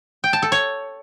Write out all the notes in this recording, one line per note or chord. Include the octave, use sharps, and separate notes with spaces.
G5
A5
A4
C#5